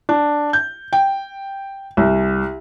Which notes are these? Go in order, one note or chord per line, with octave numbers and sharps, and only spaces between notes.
D4
G6
G5
C2